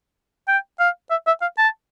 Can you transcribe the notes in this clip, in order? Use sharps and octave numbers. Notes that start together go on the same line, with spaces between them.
G5
F5
E5
E5
F5
A5